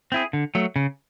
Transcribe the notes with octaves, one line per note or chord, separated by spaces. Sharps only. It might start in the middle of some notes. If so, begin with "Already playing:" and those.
C4 E4 G#4
D3
F#3 A3
C#3